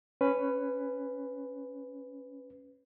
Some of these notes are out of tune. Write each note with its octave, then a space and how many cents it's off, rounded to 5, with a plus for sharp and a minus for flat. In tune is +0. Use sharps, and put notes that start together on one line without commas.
C#4 -5 B4 +10